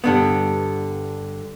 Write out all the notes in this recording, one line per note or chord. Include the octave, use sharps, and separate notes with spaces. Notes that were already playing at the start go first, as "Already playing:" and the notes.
G2 D3 B3